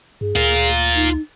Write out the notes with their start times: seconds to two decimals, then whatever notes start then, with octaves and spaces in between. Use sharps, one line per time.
0.21 G2 G#4
0.36 D2 F4 A#4
0.95 D#4